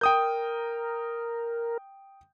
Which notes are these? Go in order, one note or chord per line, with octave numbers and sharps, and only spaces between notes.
A#4 G5 D#6 G6